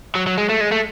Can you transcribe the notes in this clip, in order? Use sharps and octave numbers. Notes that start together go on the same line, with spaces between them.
F#3
F#3
G#3
A3
G#3
A3